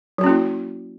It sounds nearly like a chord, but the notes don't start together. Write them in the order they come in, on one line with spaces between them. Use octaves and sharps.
F#3 F#4 C#4 A#3 E4